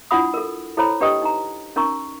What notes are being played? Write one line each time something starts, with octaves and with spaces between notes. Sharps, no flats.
D4 E4 F4 F#5 B5 D#6
A4 A#4
E4 A4 C5 C#5 A#5 B5
D4 G4 B4 D#5 G5 D#6
D#4 A#5
C#4 D#4 A#4 A#5 C#6